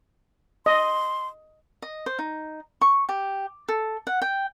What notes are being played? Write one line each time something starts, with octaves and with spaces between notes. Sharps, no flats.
D#5 C6
D#5
C5
D#4
C#6
G4
A4
F#5
G5